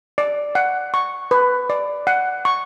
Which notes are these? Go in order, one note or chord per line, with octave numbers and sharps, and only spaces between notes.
D5
F#5
C#6
B4
D5
F#5
C#6